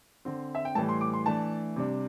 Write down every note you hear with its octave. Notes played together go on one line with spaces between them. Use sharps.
D3 C4
E5
G5
A2 E3 G3 A5
C6
D6
C6
E3 A3 D4 A5
C3 G3 D4